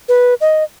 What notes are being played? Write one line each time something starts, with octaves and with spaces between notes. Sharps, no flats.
B4
D#5